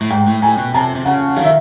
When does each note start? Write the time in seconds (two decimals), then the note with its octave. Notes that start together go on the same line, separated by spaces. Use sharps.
0.01 A2
0.11 G#2 G5
0.27 A2
0.42 A2 G#5
0.58 B2
0.74 C3 A5
0.95 C3
1.05 C#3 F#5
1.36 D#3 F5
1.44 E5